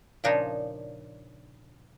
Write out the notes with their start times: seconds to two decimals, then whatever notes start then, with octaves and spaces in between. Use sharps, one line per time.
0.24 A#2 C#3 F3 D4 D#4 C#5